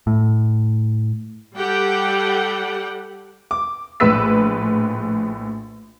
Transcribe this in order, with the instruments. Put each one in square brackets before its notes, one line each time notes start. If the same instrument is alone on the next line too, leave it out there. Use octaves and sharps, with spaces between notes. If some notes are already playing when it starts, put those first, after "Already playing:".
[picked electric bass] A2
[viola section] G3 G4 A4 F#5 G5
[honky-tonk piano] D6
A#1 A2 B4 E6 B6